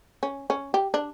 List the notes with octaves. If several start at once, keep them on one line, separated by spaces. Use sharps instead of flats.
C#4
C#4
G4
D4